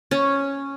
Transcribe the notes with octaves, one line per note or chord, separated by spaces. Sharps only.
C#4